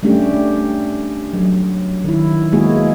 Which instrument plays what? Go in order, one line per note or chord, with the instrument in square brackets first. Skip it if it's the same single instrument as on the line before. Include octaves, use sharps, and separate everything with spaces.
[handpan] G3 A3 C#4 D4 G4
F#3
D#3 E4
G#3 A#3 B3 E4 F#4 G#4